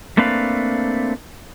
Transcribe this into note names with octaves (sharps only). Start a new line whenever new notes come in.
A3 A#3 C4 D4 B4 F5